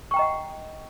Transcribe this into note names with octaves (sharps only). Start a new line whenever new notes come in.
D#5 F#5 G5 A#5 C#6